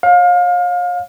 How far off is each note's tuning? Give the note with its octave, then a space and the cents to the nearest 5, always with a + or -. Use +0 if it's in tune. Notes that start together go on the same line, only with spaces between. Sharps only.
C#5 -10 F5 +30